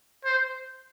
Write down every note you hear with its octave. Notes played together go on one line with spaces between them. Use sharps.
C5